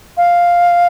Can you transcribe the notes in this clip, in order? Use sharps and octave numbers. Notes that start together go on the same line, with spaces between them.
F5